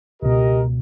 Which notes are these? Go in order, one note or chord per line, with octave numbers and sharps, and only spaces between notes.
C#2 B2 G4 A#4 D#5